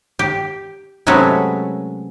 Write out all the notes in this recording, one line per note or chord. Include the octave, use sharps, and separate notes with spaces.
G4
C3 F#3 G#3 A3 C#4 B4